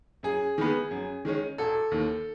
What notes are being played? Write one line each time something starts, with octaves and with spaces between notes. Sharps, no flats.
F#2 G#4
D#3 G#3 B3
F#2
D#3 G#3 C#4
E1 A4
D#2 D#3